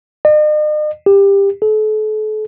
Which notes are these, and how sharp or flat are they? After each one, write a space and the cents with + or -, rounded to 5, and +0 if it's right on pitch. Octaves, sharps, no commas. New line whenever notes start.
D#5 -45
G4 +20
A4 -40